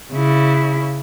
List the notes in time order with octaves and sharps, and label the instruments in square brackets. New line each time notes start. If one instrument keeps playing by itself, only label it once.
[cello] C#3 E4